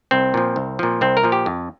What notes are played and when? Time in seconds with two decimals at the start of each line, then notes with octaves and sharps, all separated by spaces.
0.11 C2 C4
0.34 A#2 F3
0.56 C2
0.79 A#2 F3
1.01 C2 C4
1.17 A#4
1.24 A#2 F3
1.32 G4
1.46 F2